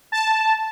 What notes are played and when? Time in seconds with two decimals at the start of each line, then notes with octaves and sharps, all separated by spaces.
0.12 A5